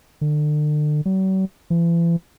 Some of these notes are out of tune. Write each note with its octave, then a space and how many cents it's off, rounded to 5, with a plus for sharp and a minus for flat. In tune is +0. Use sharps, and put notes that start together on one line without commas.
D3 +35
F#3 +45
E3 +40